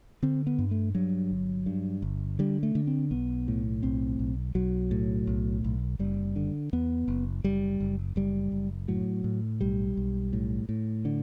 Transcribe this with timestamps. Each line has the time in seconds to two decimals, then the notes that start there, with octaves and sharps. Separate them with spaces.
0.23 D3 C4
0.47 B3
0.59 G2
0.71 A3
0.95 G2 F#3
1.31 G1
1.66 G2
2.02 G1
2.39 D3 G3
2.63 A3
2.75 D3
2.87 C4
3.11 B1 B3
3.48 A2
3.83 B1 C4
4.19 B1
4.55 B1 F#3
4.91 A2
5.27 B1
5.64 B1
5.99 F#1 G3
6.36 D3
6.73 E2 B3
7.08 F#1
7.44 F#1 G3
7.80 F#1
8.16 F#1 G3
8.52 F#1
8.88 A2 F#3
9.24 A2
9.61 B1 G3
9.97 B1
10.33 A2
10.69 A2
11.05 D3